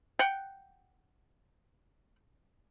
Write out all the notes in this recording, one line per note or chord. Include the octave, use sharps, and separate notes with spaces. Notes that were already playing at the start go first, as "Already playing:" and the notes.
F#5 G5